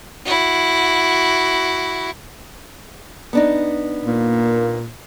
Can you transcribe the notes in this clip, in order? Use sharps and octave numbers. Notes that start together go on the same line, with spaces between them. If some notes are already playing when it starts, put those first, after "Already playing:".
E4 F#4
B3 D4 D#4
A#2 A#3